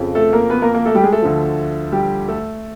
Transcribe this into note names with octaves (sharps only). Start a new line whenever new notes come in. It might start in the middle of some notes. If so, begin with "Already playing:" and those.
Already playing: F2 C#3 F3
A3 A4
A#3 A#4
B3 B4
A#3 A#4
A#3 A#4
A3 A4
G3 G4
G#3 G#4
A3 A4
D2 D3 F3
G3 G4
A3 A4